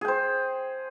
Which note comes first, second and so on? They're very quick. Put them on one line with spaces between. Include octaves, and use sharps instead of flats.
G#4 G5 C5